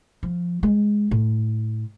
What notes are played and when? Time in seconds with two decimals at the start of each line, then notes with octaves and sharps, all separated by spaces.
0.23 F3
0.63 G#3
1.11 A2